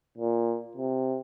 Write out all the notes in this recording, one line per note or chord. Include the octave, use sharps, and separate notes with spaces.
A#2
C3